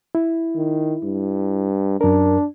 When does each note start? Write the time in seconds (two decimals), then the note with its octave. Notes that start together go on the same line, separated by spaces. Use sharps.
0.15 E4
0.56 D#3
1.04 G2
2.01 F#2 D4 A#4